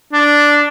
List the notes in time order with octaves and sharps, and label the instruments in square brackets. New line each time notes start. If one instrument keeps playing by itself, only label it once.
[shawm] D4